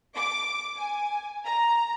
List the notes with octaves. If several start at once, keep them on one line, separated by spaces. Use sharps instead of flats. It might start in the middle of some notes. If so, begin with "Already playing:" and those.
D6
G#5
A#5